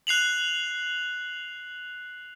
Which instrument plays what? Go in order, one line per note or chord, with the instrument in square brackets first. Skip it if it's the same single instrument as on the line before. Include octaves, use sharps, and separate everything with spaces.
[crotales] F#6 C7 F7 F#7